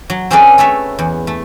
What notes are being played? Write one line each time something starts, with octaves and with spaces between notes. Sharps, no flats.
F#3
C4 C#4 G#4 A4 B4 D5
A3 A4 B4 C#5 E5
E2
A3